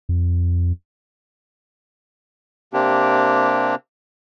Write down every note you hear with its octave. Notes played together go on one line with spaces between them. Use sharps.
F2
C3 A#3 C4 D4 G4